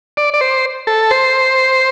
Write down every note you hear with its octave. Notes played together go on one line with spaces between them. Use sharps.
D5
D5
C5
A4
C5